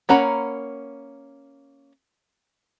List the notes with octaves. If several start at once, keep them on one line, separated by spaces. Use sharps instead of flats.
A#3 C#4 F#5 A#5 B5